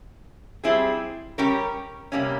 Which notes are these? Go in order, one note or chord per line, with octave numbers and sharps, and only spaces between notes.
G3 C4 E4 G#4
G3 C#4 G4 A#4
C3 G3 A#3 C#4